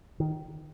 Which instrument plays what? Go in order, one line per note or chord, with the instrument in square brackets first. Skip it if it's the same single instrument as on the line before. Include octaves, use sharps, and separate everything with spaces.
[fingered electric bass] D#3